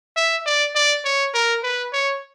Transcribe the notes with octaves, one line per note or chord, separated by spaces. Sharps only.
E5
D5
D5
C#5
A#4
B4
C#5